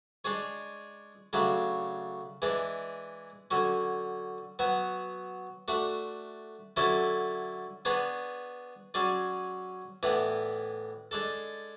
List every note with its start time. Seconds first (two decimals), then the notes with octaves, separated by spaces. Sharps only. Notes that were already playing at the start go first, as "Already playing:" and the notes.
0.25 G#3 D4 G#4 C#5
1.33 C#3 F#3 A3 D4
2.42 E3 G#3 D4 G#4
3.51 D3 F#3 C#4
4.59 F#3 B3 F#4
5.68 A3 D4 F#4
6.76 D3 F#3 C#4 E4 A4
7.85 B3 D4 G#4 C#5
8.94 F#3 C#4 G#4 D5
10.03 A2 E3 B3 D4
11.11 G#3 D4 A4